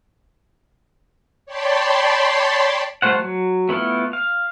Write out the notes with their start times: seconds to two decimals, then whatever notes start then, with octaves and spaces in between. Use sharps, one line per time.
1.46 C#5 D5 G5 A5 B5 C6
3.02 G3 A3 F4 C5 F#5
3.19 F#3
3.69 A3 B3 E4 F4
4.13 F5